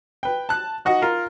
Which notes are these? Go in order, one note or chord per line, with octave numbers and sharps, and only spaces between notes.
B4 G5
A5 F#6
D#4 F#4 D#5 F#5
F4 A#4